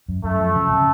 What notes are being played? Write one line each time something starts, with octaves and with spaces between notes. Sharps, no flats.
F#2
F#2 A3
F3
C#3
C#3